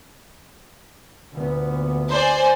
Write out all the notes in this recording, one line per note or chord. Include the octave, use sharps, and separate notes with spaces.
D2 A#2 B3
C5 D5 G#5